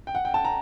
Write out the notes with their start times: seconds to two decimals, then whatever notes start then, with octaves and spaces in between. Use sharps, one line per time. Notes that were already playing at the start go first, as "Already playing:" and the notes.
0.07 G5
0.15 F#5
0.25 G5
0.34 A5
0.45 A#5